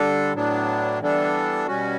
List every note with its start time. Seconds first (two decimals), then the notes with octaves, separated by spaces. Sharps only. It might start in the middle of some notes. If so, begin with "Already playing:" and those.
Already playing: D3 G3 D4 A4
0.34 A2 F#3 B3 D4
1.01 E3 G3 B3 D4 A4
1.67 B2 G3 C#4 F#4